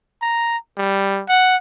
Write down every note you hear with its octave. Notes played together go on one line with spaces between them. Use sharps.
A#5
G3
F#5